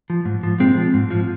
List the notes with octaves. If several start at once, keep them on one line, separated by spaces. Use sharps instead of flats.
F3
G#2
F3
A#2 G#3 C4
F3
G#2
F3